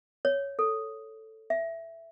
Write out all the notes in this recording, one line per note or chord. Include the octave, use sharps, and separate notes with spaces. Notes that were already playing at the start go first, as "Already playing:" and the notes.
C#5
A4
E5